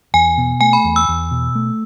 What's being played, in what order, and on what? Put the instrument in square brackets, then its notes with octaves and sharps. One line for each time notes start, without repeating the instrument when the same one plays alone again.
[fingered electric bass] E2 [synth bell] G#5
[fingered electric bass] B2
[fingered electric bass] A3 [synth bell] G#5
[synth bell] B5
[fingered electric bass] E2
[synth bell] E6
[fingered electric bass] E2
B2
A3